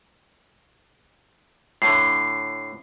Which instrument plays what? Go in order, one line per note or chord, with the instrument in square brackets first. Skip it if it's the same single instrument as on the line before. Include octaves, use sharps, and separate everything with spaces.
[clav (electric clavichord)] A2 D3 [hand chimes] C7